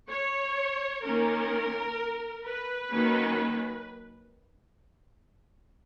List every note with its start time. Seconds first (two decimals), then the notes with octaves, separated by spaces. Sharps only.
0.10 C#5
1.04 D#3 A#3 C#4 A#4
2.44 B4
2.92 D#3 F#3 A#3 C#4